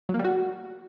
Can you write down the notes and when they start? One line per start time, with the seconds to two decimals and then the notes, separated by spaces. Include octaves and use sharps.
0.09 F#3
0.14 A#3
0.19 G3
0.24 F#4